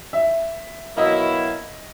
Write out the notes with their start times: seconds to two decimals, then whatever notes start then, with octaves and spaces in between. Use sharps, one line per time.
0.13 E5
0.97 B2 F#3 A#3 E4 D#5